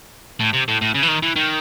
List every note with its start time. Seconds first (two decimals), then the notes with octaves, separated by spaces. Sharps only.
0.40 A2
0.53 C3
0.68 A2
0.81 A2
0.94 C#3
1.03 E3
1.08 D#3
1.23 E3
1.36 D#3